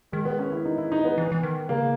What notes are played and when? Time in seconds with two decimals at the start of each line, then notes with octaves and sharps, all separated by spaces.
0.12 D#3 G#3
0.25 B3
0.39 C#4
0.52 E4
0.65 D#4
0.78 E4
0.92 D#4
1.04 B3
1.18 E3
1.32 E3
1.43 D#3
1.69 C#3 A#3